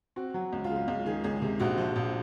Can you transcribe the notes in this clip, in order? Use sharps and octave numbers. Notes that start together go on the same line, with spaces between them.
C4 F#4
F#3
C#2
F4
C#3
F4
C#2 F4
D#3 G#4
C#2 G#4
C3
A#1 F#4
F3
A#1